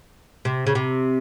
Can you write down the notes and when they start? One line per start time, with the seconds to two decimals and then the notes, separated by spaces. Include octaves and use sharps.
0.45 C3
0.67 C#3
0.75 C3